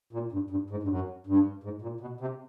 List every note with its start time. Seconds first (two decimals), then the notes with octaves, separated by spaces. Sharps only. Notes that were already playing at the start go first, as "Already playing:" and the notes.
0.13 A#2
0.32 G2
0.50 G2
0.70 G#2
0.83 G2
0.88 F#2
1.27 G2
1.63 G#2
1.82 A#2
2.01 B2
2.21 C3